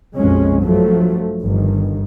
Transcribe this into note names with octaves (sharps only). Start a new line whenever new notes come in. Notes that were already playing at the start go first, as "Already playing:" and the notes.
A#1 F2 B2 G#3 C#4
G2 F3 F#3 A3
G1 G2 D#3